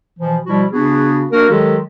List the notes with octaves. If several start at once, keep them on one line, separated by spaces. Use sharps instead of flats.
B2 E3 F3
B2 F3 G3 E4 F#4
C#3 B3 D4 F#4 G#4
A#3 D4 F#4 A#4
D#3 F#3 G#3 G4 A4